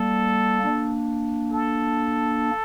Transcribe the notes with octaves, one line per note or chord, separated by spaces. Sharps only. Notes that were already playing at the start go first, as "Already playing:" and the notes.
Already playing: G3 A#3 A4
A#3 D4
A4